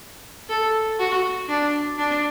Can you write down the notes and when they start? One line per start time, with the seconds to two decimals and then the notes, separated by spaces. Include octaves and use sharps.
0.49 A4
0.99 F#4
1.49 D4
1.98 D4